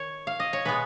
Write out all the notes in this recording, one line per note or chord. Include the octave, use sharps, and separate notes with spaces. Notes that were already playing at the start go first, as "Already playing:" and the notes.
Already playing: D#3 C#5
F5
D#5
C#5
B2 G#3 B3 B4